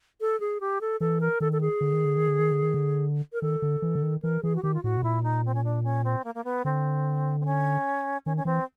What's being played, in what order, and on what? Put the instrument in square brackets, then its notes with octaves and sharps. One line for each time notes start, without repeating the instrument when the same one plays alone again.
[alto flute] A4
G#4
G4
A4
[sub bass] E3 [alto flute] A4
[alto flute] A#4
[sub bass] D#3 [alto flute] A4
[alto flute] A4
G#4
[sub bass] D3
D#3
D3
D#3
D3
D#3
D3
D#3
D3
[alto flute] A#4
[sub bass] D#3 [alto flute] A4
[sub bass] D3
E3
D3
D#3
[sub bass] E3 [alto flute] A#4
[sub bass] E3 [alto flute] G#4
[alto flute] F#4
[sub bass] D#3 [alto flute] G4
[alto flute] F4
[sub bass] A2 [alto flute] F#4
[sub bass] B2
[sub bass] A#2 [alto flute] E4
[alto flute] D#4
C4
C#4
D4
C#4
C4
A#3
A#3
B3
[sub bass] D3 [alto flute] C4
[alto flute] C4
C#4
[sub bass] D#3 [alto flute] C#4
[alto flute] C#4
[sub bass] E3 [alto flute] C4